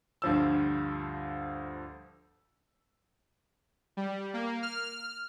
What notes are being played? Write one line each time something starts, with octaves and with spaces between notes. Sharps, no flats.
D2 G2 F3 E6
G3
A#3
F6